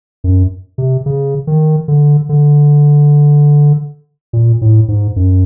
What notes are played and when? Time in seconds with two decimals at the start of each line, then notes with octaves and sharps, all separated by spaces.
0.24 F#2
0.78 C3
1.06 C#3
1.47 D#3
1.88 D3
2.29 D3
4.33 A#2
4.61 A2
4.88 G#2
5.16 F#2